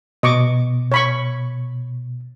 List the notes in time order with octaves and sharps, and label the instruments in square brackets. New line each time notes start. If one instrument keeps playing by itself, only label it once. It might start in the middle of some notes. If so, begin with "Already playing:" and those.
[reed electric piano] B2 [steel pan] D#5 C#6 D6
[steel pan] C#5 B5 C#6